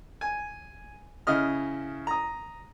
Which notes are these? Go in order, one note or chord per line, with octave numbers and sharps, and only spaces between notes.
G#5
C#3 E4 D#5 F6
A#5 D#6